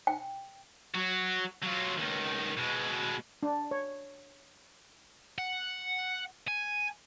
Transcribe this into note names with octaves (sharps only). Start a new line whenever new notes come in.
G5
F#3 F#4
F#3 F4
C#2 D#3
B2 G#3
D4
C#5
F#5
G#5